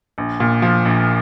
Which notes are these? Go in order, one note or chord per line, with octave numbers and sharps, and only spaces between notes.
A#1
A#2
F3
A#1